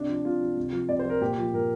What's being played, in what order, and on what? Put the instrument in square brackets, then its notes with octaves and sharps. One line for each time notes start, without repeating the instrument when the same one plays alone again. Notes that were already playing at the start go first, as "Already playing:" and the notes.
Already playing: [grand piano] C3 D4
F3
C3 F4
F3
C3
F3
C3 D5
C5
F3 A#4
A#2 G4
F3
A#2 A#4